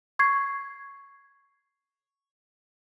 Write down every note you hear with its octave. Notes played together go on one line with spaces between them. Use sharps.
C#6 G#6 C7